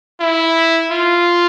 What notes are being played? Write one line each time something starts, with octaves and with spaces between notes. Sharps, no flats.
E4
F4